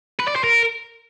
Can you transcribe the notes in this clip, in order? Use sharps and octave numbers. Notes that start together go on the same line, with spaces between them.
B4
D5
C5
A#4